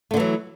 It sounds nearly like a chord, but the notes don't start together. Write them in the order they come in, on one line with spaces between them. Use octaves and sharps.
A3 D3 E3 F#3